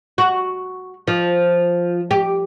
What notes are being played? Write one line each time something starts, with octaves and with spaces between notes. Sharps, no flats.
F#4
F3
G4